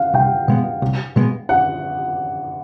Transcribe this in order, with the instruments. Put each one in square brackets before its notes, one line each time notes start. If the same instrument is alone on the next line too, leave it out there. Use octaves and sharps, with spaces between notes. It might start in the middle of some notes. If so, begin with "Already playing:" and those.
Already playing: [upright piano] F5 F#5
[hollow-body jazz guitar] C2 [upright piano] G5
[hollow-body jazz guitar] B2 G#3 B3
C2
B2 G#3 B3
[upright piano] F#5